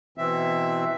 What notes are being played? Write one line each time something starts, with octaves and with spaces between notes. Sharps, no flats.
B2 E3 C4 E5